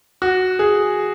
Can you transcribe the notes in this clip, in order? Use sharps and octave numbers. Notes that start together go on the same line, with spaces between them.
F#4
G#4